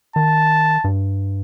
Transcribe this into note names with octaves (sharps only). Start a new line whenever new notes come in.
D#3 A5
G2